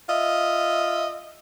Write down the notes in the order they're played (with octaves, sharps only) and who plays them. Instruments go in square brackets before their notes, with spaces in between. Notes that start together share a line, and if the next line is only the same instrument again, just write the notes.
[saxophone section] F4 D#5 E5